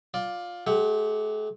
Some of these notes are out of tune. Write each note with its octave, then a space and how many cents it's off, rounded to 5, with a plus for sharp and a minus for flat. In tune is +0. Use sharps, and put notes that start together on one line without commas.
F4 +15 D5 +0
A3 -45 G4 +0 F#5 +0